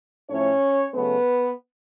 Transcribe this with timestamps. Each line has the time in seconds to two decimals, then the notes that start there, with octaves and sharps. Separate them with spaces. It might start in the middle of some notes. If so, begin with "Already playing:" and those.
0.29 A2 F3 A3 C#4 C#5
0.94 C#3 F#3 A3 B3 B4